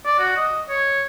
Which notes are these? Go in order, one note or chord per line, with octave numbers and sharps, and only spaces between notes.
D5
F#4
D#5
C#5